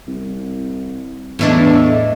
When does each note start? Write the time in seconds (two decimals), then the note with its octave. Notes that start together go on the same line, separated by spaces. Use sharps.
0.07 C2
1.39 E2 A2 E3 D4 D#5 C#6